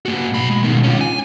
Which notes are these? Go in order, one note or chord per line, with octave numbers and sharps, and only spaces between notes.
A#3 F#4
B1 B5
G#3
B2 D#3
C#4 F4
G#5